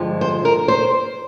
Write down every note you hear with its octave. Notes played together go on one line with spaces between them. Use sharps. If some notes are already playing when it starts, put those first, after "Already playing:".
Already playing: G2 D3 F3 G#3
C5
A#4
C5